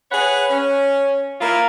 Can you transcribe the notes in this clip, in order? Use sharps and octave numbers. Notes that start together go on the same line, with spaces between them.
G#4 B4 C#5 F#5
C#4
A#3 E4 F4 A#4